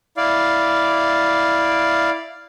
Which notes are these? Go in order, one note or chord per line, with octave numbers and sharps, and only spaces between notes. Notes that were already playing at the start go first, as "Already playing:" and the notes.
E4 D5 F5